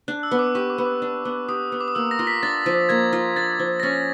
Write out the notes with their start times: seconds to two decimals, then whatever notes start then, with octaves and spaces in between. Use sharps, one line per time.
0.08 D4 F#6
0.23 E6
0.31 B3
0.39 D6
0.55 G4 C#6
0.70 D6
0.78 B3
0.86 D6
1.02 D4
1.25 B3
1.48 G4 D#6
1.72 B3
1.81 D6
1.88 D#6
1.95 A#3 E6
2.11 A#6
2.19 F4
2.27 B6
2.43 D4 A6
2.66 F3
2.89 A#3 G#6
3.13 F4
3.36 D4 A6
3.59 F3
3.80 A#6
3.83 C#4 A6